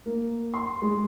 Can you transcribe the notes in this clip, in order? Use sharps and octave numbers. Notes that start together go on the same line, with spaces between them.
A#3
C6
G#3